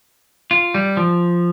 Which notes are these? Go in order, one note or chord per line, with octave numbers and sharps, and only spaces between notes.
F4
G3
F3